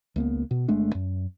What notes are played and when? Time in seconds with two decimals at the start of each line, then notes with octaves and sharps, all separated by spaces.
0.16 C#2 A#3 B3
0.51 B2
0.68 G1 G#3 A3 D4
0.95 F#2